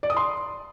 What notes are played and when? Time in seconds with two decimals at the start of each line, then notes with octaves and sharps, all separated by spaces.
0.03 D5
0.10 D#6
0.17 C6